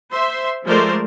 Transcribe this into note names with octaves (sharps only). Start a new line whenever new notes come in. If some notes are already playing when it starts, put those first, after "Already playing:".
C5 E5 C6
F3 G#3 A3 A#4 C5 D5